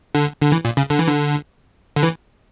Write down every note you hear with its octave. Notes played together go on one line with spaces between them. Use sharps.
D3
D3
E3
A#2
C#3
D3
E3
D3
D3
E3